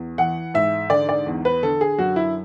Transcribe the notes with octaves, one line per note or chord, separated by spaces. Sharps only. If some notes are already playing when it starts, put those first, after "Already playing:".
Already playing: E2
E3 F#5
G#2 E5
D3 D5
D5
E2
B4
D3 A4
G#4
F#2 F#4
E4